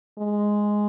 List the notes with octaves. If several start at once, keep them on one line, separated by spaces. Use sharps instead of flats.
G#3